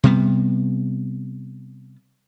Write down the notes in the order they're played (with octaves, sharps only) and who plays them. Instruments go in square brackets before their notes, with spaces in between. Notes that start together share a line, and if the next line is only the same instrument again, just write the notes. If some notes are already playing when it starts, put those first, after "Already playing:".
[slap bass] C3 G3 B3